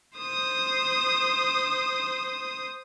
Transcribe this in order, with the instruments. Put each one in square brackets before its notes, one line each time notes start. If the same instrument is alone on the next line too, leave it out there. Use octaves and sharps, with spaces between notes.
[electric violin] C5 D#6